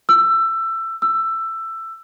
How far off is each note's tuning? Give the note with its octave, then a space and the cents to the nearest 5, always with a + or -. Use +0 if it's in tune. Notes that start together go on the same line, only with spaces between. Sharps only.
E6 +20
E6 +15